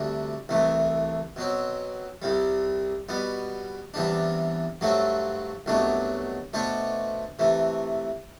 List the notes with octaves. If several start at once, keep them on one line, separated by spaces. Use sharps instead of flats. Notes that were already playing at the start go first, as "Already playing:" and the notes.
Already playing: D2 C3 G3 D4 F#4
C2 C3 E3 A3
B2 F#3 C4
C2 C3 G3
B2 G3 B3
E2 C3 E3 G3 D4
G2 F#3 A3 C4 F#4
C2 B2 F#3 A3 D4
B2 A3 D4 A4 C5
C3 E3 A3